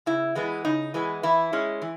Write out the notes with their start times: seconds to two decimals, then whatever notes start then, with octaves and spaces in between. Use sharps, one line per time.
0.06 C#3 E4
0.35 E3 G#3 B3
0.65 C#3 D#4
0.94 E3 G#3 B3
1.23 E3 E4
1.53 G#3 C#4
1.82 E3